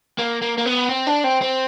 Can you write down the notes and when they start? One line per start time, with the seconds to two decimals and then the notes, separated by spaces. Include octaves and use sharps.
0.19 A#3
0.42 A#3
0.58 A#3
0.66 B3
0.89 C4
1.07 D4
1.24 C4
1.42 C4